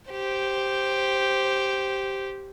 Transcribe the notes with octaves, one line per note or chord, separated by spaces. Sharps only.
G4 C5